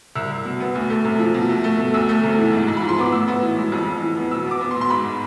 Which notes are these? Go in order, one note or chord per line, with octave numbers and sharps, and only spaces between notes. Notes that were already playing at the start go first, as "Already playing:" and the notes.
C2 E6
C2
B2
B3
D2
A3
C3
F3
B2
A3
A3
B2
D2 E6
A3
C3
E3
G#2
G#2
B5
F3
C6
B3 D6
A2 E6
B3
E3
G#3
F2
F2
E3
B3
B2 E6
B3 D6
B3
C6
B2
C6
G#2 B5